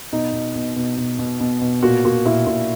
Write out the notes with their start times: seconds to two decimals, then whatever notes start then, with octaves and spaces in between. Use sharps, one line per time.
0.13 B2 D#4
0.33 B2
0.55 B2
0.76 B2
0.97 B2
1.19 B2
1.40 B2
1.62 B2
1.83 A#2 F#4
2.05 A#2 F#4
2.26 A#2 E4
2.47 A#2